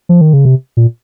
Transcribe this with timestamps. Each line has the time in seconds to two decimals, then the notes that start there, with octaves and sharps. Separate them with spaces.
0.09 F3
0.21 D#3
0.33 C#3
0.45 C3
0.77 A#2